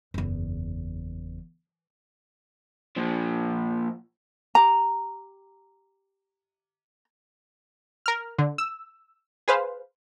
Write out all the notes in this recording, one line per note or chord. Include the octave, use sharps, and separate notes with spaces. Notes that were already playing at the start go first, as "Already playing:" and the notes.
F#1 E2
A#2 F3
G4 A#5
A#4 F6
D3
E6
G#4 B4 C5 F5